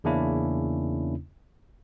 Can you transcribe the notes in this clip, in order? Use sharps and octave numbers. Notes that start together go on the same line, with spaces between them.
E2 C#3 A#3 C#4 D4 E4